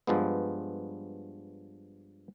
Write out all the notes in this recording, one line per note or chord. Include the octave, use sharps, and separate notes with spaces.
G2 F3 G#3 B3